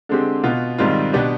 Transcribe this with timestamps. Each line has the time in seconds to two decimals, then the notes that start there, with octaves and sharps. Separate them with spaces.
0.09 D3 G#3 C4 G4
0.43 B2 B3 F4
0.78 G#2 D#3 G3 C4 F4
1.13 B2 B3 D4 G4